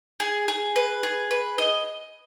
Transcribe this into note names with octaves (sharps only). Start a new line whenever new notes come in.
G#4
G#4
B4
G#4
B4
D#5